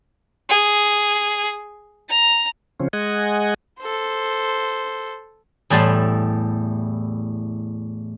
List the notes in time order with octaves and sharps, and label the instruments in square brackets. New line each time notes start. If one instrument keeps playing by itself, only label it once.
[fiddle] G#4
A#5
[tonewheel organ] C#3 F3 C4 C#4
G#3 D#5 F#5 G#5
[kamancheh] A4 C5
[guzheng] E2 A2 G3 A5 C6